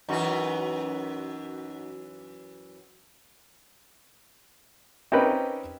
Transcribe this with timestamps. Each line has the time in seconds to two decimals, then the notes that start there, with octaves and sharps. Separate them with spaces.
0.09 F#2 E3 D#4 F#4 B4
5.12 C4 C#4 D#4 G4 A#4 B4